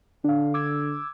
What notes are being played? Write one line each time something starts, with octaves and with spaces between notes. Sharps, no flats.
D3 D4 F5
D6 E6 G#6